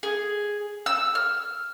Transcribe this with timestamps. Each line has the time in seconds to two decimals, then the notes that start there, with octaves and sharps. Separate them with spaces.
0.03 G#4
0.86 E6
1.15 F6